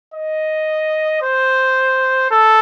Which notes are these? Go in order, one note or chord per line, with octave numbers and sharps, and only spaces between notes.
D#5
C5
A4